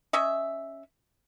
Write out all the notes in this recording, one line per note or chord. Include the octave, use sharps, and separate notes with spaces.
C#4 D#5 E5